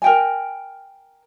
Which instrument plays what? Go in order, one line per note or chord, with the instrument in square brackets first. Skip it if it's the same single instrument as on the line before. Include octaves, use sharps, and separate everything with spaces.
[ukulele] A#4 G5 G#5